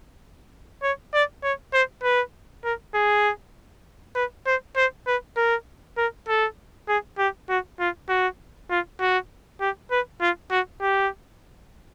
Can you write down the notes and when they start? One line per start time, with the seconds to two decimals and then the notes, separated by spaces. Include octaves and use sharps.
0.83 C#5
1.14 D5
1.43 C#5
1.73 C5
2.03 B4
2.64 A#4
2.95 G#4
4.15 B4
4.46 C5
4.77 C5
5.07 B4
5.36 A#4
5.97 A#4
6.28 A4
6.88 G#4
7.18 G4
7.49 F#4
7.80 F4
8.09 F#4
8.70 F4
9.00 F#4
9.60 G4
9.91 B4
10.21 F4
10.51 F#4
10.81 G4